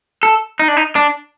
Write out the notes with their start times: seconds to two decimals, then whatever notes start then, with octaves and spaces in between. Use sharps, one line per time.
0.23 A4
0.59 D#4
0.68 D4
0.77 D#4
0.96 D4